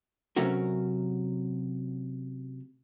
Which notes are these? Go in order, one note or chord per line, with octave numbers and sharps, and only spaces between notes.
C3 F#3 A3 C#4 F#4 A#4